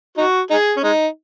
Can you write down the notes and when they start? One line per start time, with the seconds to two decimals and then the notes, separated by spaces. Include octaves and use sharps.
0.18 D#4 F#4
0.51 D#4 G#4
0.77 C#4
0.84 G#3 D#4